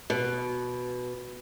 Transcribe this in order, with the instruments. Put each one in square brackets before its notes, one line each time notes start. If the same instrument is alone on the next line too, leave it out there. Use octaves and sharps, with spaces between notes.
[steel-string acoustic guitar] B2